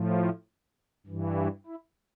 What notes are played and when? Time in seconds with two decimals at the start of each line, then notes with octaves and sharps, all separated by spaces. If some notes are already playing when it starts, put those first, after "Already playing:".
Already playing: A2 F3
1.06 G2 E3
1.67 E4